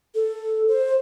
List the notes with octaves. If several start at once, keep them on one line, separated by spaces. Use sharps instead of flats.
A4
C5